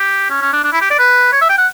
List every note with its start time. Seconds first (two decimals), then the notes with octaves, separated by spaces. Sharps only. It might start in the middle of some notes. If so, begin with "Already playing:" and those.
Already playing: G4
0.30 C#4
0.41 C#4
0.53 D4
0.64 D4
0.73 E4
0.81 G4
0.90 D5
0.99 B4
1.32 C#5
1.41 E5
1.49 G5
1.58 F#5